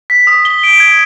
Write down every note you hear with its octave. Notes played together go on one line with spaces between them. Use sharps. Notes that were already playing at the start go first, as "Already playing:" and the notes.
B6
D#6
G7
D7
G#6